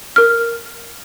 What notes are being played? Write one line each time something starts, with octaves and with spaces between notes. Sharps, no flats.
A#4 F6